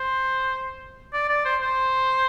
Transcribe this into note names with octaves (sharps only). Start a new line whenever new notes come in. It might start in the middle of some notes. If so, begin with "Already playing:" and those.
Already playing: C5
D5
D5
C5
C5